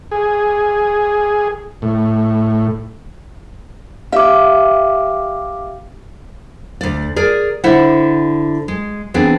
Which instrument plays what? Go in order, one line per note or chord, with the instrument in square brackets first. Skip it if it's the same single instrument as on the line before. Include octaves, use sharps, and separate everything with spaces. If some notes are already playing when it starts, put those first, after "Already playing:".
[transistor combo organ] G#4
A2
[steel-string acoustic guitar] G4 E5 [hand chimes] F5 D6
[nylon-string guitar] D2 D5
G#4 A#4 D5
D3 E4 C5 E5 F#5
G#3
E3 B3 C4 D4 G#4